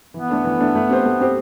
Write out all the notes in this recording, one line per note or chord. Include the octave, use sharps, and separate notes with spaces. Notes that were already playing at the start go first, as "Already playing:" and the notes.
E3 B3
A3 D4 A4
E3
A3 D4 A4
A3
C4 G4 C5
A3
C4 G4 C5